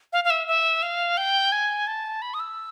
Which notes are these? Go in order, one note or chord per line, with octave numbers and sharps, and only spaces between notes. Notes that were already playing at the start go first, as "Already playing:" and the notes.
F5
F5
E5
E5
F5
G5
G#5
A5
B5
D#6
E6